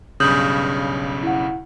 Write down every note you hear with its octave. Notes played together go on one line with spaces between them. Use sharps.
B1 G2 C#3 D#6 G6 F#7
E4 F#5